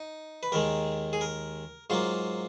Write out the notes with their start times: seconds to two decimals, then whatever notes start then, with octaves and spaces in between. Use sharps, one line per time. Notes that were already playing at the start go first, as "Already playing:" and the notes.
Already playing: D#4
0.43 B4
0.52 D#2 D#3 G#3 A#4
1.13 G#4
1.21 A#4
1.90 G#2 F#3 A#3 F4